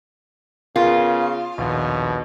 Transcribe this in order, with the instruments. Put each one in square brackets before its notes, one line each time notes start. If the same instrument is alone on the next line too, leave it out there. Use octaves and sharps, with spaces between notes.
[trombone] C#3 [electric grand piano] B3 G#4 A#4 [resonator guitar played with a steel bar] F4
[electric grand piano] A#1 D#2 [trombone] B2